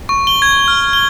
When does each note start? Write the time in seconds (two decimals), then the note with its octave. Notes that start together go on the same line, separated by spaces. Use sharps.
0.09 C#6
0.27 G7
0.42 G#6
0.68 F6
0.93 G7